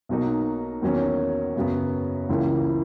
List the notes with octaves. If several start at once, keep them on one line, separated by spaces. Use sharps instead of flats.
B1 B2 F#3 A#3 D#4
E2 D#3 F#3 A#3 C#4
F#2 C#3 F#3 B3
C#2 C#3 E3 A#3 E4